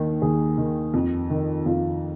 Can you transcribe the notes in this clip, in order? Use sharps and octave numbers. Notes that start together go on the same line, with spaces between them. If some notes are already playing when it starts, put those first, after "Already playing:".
Already playing: D#2 D#3
D#2 G#4
D#3
F2
D#3
F2 F4